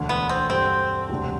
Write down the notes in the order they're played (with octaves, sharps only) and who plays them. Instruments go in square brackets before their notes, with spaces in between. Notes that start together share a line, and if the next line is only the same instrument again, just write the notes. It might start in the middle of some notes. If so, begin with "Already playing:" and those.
Already playing: [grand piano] E1 D2 D3
[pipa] B3
C4
[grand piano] G2 D3 G3 [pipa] C4
[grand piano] E1 D2 C3 G3 D4